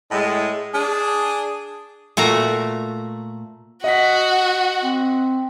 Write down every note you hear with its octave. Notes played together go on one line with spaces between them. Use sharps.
A2 G#3
D4 G#4
A#2 A3 F#4 A#5
F#4 D#5 F#5 B6
C4